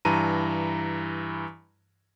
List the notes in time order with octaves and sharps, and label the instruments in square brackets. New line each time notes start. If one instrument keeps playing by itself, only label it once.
[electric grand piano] G2 E3 A5 A#5 D#7